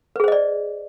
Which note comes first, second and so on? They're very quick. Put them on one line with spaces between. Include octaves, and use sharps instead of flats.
B4 G#4 C5 D#5 D5